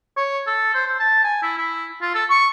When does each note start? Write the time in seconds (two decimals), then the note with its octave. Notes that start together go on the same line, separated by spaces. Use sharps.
0.17 C#5
0.47 A4
0.74 C5
0.87 C5
1.00 A5
1.24 G#5
1.43 E4
1.58 E4
2.02 F4
2.14 A4
2.30 C#6